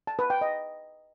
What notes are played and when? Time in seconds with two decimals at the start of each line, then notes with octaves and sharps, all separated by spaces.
0.07 A5
0.19 B4
0.30 G5
0.41 D#5